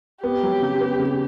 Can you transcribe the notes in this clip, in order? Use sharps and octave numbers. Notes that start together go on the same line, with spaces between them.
B3 G4
F#3
C#3
B3
C#3